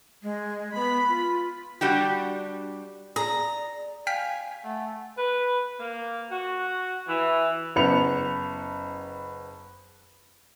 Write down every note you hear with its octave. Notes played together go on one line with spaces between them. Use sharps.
G#3
B3 B5
F4
G3 D4 F#4 G4
G#4 D5 A#5
F5 G5 G#5 F6 B6
A3 F#5
B4
A#3
F#4
E3
F#1 B3 B5 C#7 F7